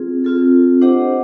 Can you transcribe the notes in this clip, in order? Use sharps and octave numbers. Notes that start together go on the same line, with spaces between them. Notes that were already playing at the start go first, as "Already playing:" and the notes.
Already playing: C4 F4 G#4
C4 F4 A4
D4 G4 C5 D#5 F#5